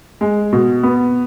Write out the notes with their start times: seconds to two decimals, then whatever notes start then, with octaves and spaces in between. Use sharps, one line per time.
0.21 G#3
0.53 B2
0.83 B3